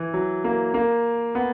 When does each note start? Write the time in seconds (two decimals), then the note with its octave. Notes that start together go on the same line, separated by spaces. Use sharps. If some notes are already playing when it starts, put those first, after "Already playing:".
Already playing: E3
0.14 F#3
0.44 A#3
0.74 A#3
1.35 B3